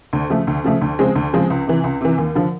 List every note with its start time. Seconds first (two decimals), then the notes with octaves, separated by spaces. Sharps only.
0.13 D2
0.30 C#3 F3 A3
0.47 D2
0.64 C#3 F3 A3
0.82 D2
0.99 C#3 F3 G#3 C4
1.15 D2
1.33 C#3 F3 G#3 C4
1.50 C#2
1.67 C3 E3
1.84 C#2
2.01 C3 E3
2.18 D#2
2.35 D3 F3